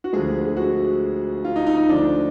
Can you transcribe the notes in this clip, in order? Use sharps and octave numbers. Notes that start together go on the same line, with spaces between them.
F#4
D2 D3 F3 G#3 G#4
G#4
F#4
F4
D#4
D#4
D#4
D2 D3 F3 D4